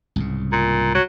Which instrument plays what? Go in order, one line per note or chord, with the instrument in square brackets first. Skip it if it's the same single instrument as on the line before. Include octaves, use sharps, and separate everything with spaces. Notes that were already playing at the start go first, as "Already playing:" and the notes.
[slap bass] C2 G#2 C#3
[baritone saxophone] A#2
F#3